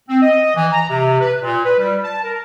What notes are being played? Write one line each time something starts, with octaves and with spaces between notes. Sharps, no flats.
C4
D#5
E3
A#5
C3
B4
A#2
B4
G3
A5
A#4